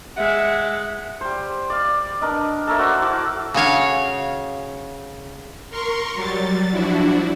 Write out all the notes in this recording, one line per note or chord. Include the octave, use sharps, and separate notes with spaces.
G#3 E5 F#5
G3 C5
D5 F5
D4 A#4 B4 D#5
A4 A#4 C#5 E5
F#4 C5 D5
E4 F#4 D6
C#3 F#4 C#5 F5
A#4 C6 C#6
F#3 G3 A6
F3 D4 E4 F#4